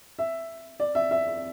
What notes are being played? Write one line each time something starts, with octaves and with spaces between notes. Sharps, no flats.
E5
D5
E5
E5